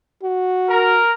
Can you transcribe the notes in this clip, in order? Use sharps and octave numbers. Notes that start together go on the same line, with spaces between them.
F#4
A#4